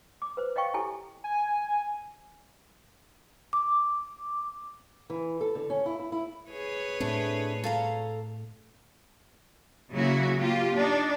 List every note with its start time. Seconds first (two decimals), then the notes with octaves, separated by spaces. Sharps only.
0.22 D6
0.37 B4 C5
0.56 C#5 D#5 F5 G5 C#6
0.74 E4 G4 A4 C#5 G#5
1.24 G#5
3.53 D6
5.10 E3
5.41 A4
5.55 D3
5.70 C#4
5.86 E4
5.99 E4
6.12 E4
6.50 G#4 B4 C#5
7.00 A2 A3 C4 D4
7.64 A4 F5 A#5
9.93 C#3 F#3 A#3 E4 F#4
10.38 A#3 F4 G4
10.75 D4 D#4